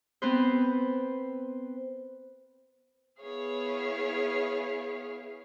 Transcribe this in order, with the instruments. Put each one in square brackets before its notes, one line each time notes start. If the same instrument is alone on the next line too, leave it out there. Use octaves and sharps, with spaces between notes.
[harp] B3 C4 B4 C5
[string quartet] B3 E4 G#4 C#5 F5